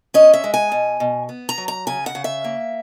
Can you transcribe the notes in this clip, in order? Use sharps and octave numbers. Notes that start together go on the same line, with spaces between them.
C#4 D#5
E5
G#3
G#5
B2
B2
B3
A#5
F#3
A#5
C#3 G#5
F#5
C#3
E5
A#3